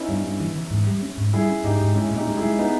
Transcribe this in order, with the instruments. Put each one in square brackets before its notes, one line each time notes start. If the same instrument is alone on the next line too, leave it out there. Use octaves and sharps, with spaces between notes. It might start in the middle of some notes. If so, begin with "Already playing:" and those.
Already playing: [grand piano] B3 C#4 D#4 E4
[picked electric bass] G2
G2
E3
E3
G#2
G3
C#4
G#2
[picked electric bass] G3 [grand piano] E4 G#4
[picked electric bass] C#4
[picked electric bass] G#2 [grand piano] D#4 G4
[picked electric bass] G#2
[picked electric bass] G#3 [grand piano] C#4 E4
[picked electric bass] A#2
[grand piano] D#4 G4
[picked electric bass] G#3
[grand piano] E4 G#4
[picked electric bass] G#3
[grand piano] B3 D#4